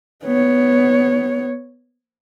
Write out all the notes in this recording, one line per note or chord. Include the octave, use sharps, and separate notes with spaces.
B3 C#5